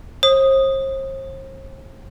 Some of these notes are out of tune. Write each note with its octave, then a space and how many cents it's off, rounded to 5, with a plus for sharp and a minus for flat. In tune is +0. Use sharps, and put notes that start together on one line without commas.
C5 +45 D#6 +0